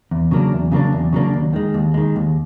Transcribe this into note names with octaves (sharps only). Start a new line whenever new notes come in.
E2
C#3 F#3 A#3 D4
E2
C#3 F#3 A#3 D4
E2
C#3 F#3 A#3 D4
D#2
D#3 G#3
D#2
D#3 G#3
D#2